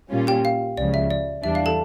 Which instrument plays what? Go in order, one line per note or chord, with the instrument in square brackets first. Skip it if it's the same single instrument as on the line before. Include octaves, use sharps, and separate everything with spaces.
[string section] A#2 G3 C#4 F4
[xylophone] G4 G5
F5
[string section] C#2 C#3 F3 [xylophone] D5
[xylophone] E5
D5
[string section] E2 E3 G3 D4 [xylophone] E5
[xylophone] F5
A4 A5